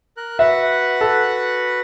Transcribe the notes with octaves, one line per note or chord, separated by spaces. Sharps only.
A#4 F#6
F#4 B4 E5 F#5
A4